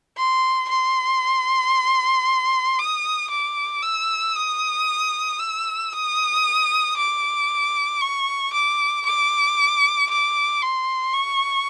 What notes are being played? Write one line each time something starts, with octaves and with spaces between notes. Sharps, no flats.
C6
C6
D#6
D6
E6
D#6
E6
D#6
D6
C#6
D6
D6
D6
C6
C#6